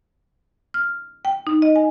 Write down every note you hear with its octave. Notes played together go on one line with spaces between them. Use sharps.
F6
G5
D#4
D#5
G#5